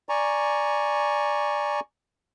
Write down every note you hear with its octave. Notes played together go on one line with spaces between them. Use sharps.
D5 G#5 A#5 C#6